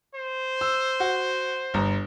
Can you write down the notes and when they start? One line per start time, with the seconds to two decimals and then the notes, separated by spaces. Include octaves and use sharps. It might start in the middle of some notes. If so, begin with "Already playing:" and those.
0.15 C5
0.61 E6
1.00 F#4
1.74 G1 A#5